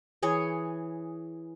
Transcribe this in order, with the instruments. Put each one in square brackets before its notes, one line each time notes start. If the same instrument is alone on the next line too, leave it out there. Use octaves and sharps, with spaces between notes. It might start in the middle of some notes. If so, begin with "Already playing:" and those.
[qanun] E3 G#4 C#5